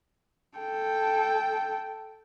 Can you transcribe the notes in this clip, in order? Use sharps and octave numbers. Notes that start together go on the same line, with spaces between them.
A4 G5